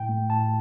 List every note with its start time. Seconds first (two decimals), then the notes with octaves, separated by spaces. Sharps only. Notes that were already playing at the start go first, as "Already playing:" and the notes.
Already playing: A2 G5
0.09 A3
0.29 A2 A5